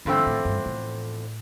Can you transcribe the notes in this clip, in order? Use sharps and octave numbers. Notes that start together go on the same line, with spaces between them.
E2 G2 D3 F3 A3 C4
A2
G2
A2